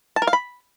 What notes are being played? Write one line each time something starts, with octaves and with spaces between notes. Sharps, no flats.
A5
A#4
F5
B5